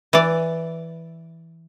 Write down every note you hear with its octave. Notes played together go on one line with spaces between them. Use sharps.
E3 D5